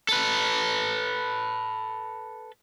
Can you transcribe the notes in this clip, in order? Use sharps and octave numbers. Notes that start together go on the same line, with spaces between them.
A4 B4